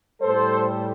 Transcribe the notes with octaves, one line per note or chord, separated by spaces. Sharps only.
A2 G3 A4 C5